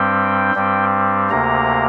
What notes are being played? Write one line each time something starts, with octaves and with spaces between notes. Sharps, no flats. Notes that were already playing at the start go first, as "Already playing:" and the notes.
Already playing: G2 G3 C4 G5
G2 G3 C4
D2 C3 A#3 A#5